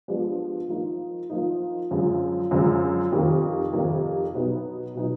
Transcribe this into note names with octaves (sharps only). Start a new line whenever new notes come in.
F3 G#3 B3 D4 G4
F3 A#3 D#4
F3 A#3 D#4
F#2 D3 F3 G#3
F#2 D3 F3 G#3
F2 C3 D#3 G3 A#3
F2 C3 D#3 G3 A#3
B2 F#3 B3 D#4
B2 F#3 B3 D#4